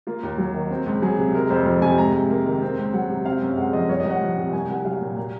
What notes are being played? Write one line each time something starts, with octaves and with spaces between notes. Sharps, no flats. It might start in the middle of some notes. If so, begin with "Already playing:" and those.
A#3 F4
D#2
F#3
D#3
C4
C#2
F#3 G#4
C3
G#3 A#4
F2 C5
F3
C3 G#5
G#2 A#5
G#2
A#3
D#3
C4
C#2
F#3 F#5
C3
C4 F5
F#2
G#3 F#5
F3 D#5
C2 C#5
C2 D#5
F#5
F3
C3
C2 G#5
C2 F#5
F#3 F5
A#2
A#3